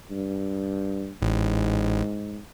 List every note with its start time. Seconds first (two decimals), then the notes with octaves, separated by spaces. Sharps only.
0.11 G2
1.22 A1 G#2